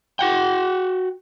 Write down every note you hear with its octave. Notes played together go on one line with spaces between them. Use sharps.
F#4 F#5 G5